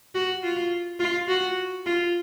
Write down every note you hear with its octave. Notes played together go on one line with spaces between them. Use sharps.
F#4
F4
F4
F#4
F4